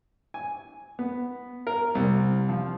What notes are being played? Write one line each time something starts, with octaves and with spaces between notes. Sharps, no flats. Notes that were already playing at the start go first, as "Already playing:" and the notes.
G#5
B3
A#4
C2
F3